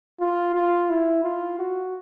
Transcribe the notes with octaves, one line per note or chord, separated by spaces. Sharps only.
F4
F4
E4
F4
F#4